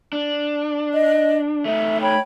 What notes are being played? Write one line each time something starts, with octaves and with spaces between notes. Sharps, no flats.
D4
D#5
A3 D#4 E5
C#5 G5 B5